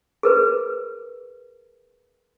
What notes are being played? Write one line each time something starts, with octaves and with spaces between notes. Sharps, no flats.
G#4 A#4 B4